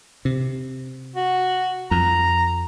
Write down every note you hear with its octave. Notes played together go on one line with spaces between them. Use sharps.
C3
F#4
F2 A#5